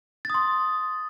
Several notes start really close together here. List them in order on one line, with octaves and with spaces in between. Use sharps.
A6 D#6 C6